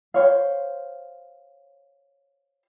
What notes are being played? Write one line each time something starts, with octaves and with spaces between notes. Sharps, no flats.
C5 C#5 F5